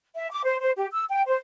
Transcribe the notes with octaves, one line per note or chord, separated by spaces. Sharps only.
E5
D6
C5
C5
G4
E6
G5
C5